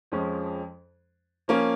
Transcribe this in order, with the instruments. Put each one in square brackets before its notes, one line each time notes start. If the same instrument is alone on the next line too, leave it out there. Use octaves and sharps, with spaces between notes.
[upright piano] F2 F3 G#3 C#4
F3 A#3 C#4